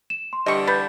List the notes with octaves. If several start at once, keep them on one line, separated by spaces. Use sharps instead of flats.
E7
C6
D3 E3 G3 D#5 C#6
B4 G6 A6